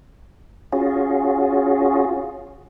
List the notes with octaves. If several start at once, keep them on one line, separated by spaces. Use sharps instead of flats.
C#4 F4 F#4 G#4